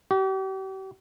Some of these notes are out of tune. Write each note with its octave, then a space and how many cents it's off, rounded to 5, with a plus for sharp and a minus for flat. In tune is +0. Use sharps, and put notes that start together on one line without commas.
G4 -40